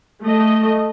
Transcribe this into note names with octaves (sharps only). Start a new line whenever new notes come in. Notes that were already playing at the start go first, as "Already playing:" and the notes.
A3 D#5